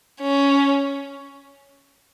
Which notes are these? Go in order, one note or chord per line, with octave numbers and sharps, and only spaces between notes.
C#4